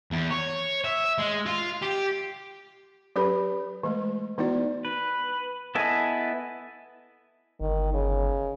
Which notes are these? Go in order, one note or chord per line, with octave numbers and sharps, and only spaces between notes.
E2
C#5
E5
G#3
F4
G4
F#3 C#4 G4 A4 B4 B5
E3 G#3 A3
E3 B3 D#4 E4 F#4 D5
B4
B3 E4 A4 D#5 G#5
G1 D#3
C#3